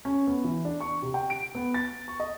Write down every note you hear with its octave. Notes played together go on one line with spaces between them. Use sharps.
C#4
B3
E3
D4
C#6
C3
G5
D7
B3
A6
C#6
D#5